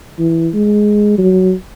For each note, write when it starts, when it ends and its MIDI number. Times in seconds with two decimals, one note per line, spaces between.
0.19 0.48 52
0.54 1.16 56
1.18 1.54 54